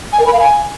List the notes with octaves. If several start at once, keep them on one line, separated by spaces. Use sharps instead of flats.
G#5
A#4
B5
F5
G#5